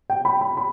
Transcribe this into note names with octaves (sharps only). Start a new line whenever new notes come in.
G5
B5
B5
B5